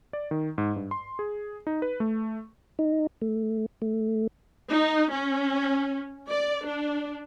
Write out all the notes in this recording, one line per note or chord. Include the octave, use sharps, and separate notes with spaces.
D5
D#3
G#2
G2
C6
G#4
D#4
B4
A3
D#4
A3
A3
D#4
C#4
D5
D4